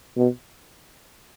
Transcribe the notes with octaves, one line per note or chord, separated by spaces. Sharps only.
B2